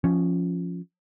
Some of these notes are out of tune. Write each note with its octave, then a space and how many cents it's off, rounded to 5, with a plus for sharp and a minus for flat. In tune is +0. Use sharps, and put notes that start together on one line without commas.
F3 +0 C#4 +0